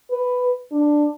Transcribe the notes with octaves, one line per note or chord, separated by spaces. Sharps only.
B4
D4